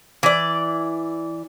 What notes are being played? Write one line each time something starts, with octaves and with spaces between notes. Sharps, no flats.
E3 D5